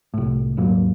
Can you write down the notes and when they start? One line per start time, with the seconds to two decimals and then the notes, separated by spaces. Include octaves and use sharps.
0.14 C2 A2
0.57 D#2 G#2 F#3 A#3